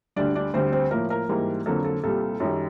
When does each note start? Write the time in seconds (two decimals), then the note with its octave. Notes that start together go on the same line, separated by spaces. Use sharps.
0.16 D2 D3 G3 D4 D5
0.35 D4 D5
0.54 D2 D3 G3 C4 C5
0.72 C4 C5
0.91 A2 F3 A#3 A#4
1.10 A#4
1.29 G#2 E3 G3 A#3
1.66 F2 D3 F#3 A#3 A4
1.84 A4
2.04 C2 A#2 G3 A4
2.40 F#2 D#3 G3